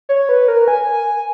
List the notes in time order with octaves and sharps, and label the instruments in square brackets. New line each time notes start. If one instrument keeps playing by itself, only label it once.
[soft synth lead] C#5
B4
A#4
G#5